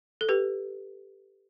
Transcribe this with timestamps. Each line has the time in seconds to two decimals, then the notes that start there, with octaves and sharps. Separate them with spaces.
0.21 A4
0.29 G4 B4